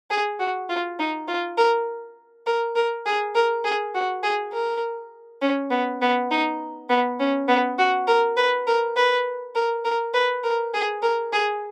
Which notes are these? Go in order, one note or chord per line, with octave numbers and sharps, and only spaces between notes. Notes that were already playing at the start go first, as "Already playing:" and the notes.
G#4
F#4
F4
D#4
F4
A#4
A#4
A#4
G#4
A#4
G#4
F#4
G#4
A#4
C#4
B3
B3
D#4
B3
C#4
B3
F#4
A#4
B4
A#4
B4
A#4
A#4
B4
A#4
G#4
A#4
G#4